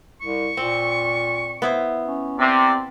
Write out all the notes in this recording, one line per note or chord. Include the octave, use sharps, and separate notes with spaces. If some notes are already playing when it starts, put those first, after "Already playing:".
C2 C#6
A#2 C4
B3 E4 C5
C#4
C3 C4 D5